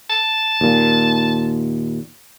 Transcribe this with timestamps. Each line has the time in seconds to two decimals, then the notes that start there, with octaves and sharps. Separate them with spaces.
0.10 A5
0.61 D#2 A#2